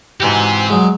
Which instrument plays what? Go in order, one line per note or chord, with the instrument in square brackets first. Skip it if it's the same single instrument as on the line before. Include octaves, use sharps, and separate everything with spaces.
[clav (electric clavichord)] G#2 E3 F#4 [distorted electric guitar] G4 C5
[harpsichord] F#3 G#3